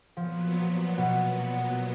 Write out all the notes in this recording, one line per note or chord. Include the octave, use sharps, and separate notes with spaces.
A#2 F3 F#3 B3
B2